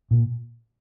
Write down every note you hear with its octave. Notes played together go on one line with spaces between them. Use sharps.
A#2